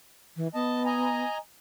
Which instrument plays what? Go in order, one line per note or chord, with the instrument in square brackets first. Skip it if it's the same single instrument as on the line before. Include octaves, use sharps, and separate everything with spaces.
[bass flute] E3
[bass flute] B3 [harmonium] D#5 A5
[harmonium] D#5 G#5 A#5